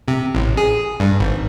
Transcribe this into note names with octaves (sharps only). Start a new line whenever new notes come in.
C3
A1
G#4
G2
G#1